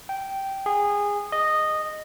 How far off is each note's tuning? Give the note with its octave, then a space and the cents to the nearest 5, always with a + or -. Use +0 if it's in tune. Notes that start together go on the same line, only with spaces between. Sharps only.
G5 -10
G#4 -20
D#5 -10